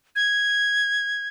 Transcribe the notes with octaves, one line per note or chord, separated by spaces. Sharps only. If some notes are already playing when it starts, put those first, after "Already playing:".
G#6